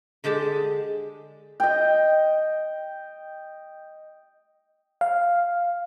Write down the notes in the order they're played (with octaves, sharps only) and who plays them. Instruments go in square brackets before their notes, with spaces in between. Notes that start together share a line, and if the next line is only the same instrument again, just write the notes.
[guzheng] D3 G#3 G4 A5
[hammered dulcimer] D#5 G5
[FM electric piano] F5